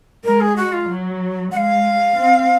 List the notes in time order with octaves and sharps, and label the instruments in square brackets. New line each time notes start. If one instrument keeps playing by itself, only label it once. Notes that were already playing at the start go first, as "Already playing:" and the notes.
[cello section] G#3 [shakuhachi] A#4
[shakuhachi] G#4
F#4
F4
[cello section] F#3
[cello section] G#3 [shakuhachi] F#5
[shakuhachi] F5
[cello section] C4